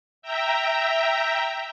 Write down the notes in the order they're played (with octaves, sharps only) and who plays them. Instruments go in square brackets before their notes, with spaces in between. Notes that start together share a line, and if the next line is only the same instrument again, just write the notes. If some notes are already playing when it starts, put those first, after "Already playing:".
[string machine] E5 G5 A#5